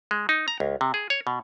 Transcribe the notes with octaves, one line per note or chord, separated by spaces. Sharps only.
G#3
D#4
A#5
C#2
C3
G#4
C#5
B2